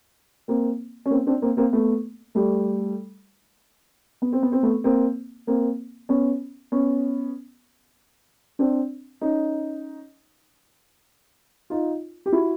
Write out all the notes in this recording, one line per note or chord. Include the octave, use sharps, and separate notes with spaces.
A#3 C4
C#4
A#3 C4
C4 D4
A#3 C4
A#3 C4
A3 B3
G3 A3
B3
C4
B3
C4
A3 B3
A#3 C4
A#3 C4
B3 C#4
B3 C#4
C4 D4
C#4 D#4
D#4 F4
G4
E4 F#4